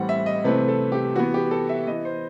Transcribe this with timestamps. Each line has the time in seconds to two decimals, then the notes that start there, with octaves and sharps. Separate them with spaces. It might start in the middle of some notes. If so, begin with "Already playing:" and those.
Already playing: A2 E3 G3 C4 F#5
0.09 E5
0.26 D#5
0.44 C3 E3 A3 C4 B4
0.68 A4
0.92 G4
1.16 E3 B3 F#4
1.34 G4
1.51 A4
1.69 E5
1.87 E3 B3 D#5
2.05 C5